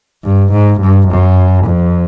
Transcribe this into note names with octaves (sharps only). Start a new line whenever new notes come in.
G2
G#2
G2
F#2
F2